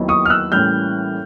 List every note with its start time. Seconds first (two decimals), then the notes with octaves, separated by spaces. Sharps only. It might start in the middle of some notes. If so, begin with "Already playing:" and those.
Already playing: D#2 D#3 F#3 B3 E4
0.08 C#6 D#6
0.25 F6
0.30 E6 F#6
0.52 A2 E3 G3 A#3 C#4 F6 G6